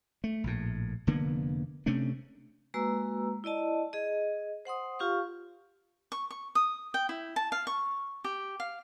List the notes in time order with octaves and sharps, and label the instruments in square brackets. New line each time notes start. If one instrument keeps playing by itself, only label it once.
[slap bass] A3
A#1 A2
F1 D3 A#3 B3
C3 A3 C#4 D4
[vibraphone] G#3 A#3 F#4 B4 A#5 E6
E4 D5 D#5 A5
G#4 D#5
C5 F#5 C6 D#6
F4 G4 F5 C#6
[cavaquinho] C#6
C#6
D#6
G5
E4
A5
F5
C#6
G4
F5